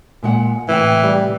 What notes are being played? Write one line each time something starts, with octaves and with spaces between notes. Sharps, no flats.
A#2 G#3 F#5
A2 C3 E3 G5
G3